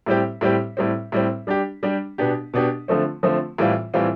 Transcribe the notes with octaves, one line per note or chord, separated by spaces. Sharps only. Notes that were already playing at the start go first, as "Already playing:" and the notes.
A2 G3 C4 G4
A2 G3 C4 G4
A2 G3 C4
A2 G3 C4
G3 D4 G4
G3 D4 G4
B2 B3 D4 G4
B2 B3 D4 G4
D3 F3 A3 C4
D3 F3 A3 C4
A2 E3 G3 C4 F4
A2 E3 G3 C4 F4